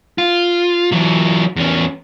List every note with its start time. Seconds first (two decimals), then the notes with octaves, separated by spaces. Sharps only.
0.18 F4
0.92 E3 F#3
1.56 E2 C#4